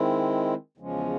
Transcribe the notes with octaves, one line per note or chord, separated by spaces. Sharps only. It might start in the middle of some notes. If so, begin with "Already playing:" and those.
Already playing: D#3 G#3 C4 E4
E2 C#3 F3 G#3 C#4